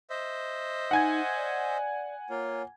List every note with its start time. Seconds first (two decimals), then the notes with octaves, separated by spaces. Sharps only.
0.10 C5 D#5 E5
0.91 D#4 F#5 G#5 G#6
1.36 D5
2.30 A#3 F4 C#5